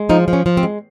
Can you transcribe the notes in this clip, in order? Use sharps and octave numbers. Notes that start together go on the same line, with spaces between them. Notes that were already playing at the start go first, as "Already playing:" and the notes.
Already playing: G#3
F3 D#4
F3
C#4
F3
C4
G#3